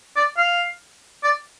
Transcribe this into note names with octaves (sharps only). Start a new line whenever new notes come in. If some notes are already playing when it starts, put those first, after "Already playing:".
D5
F5
D5